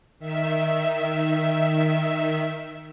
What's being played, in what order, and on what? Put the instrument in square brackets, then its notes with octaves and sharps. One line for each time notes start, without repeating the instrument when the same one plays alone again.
[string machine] D#3 E5